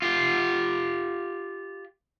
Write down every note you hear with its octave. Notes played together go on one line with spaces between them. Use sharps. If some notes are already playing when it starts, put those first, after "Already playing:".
F4 G4